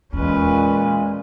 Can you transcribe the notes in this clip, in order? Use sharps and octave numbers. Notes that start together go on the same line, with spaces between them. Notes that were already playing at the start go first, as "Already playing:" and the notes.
E2 A#2 G#3 C#4 B4